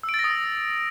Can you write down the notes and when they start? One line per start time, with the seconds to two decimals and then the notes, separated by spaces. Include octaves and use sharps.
0.03 E6
0.09 D7
0.14 A6
0.19 A#6
0.24 D#6